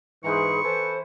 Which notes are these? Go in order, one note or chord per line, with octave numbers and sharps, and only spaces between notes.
G#2 E3 G#4 B4 C5 A#5 C#6
E3 A4 B4 C5